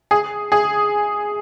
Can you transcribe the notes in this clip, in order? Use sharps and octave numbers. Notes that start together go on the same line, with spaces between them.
G#4
G#4